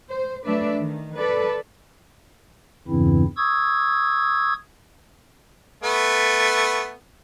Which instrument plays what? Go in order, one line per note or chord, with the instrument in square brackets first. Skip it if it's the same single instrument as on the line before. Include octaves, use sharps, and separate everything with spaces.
[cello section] C5
F#3 A3 D4 B4 D5 E5
D#3
A4 B4 D5
[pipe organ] E2 G2 C#3 E3 C4 E4
C#6 D#6 E6 G#6
[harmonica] A3 B3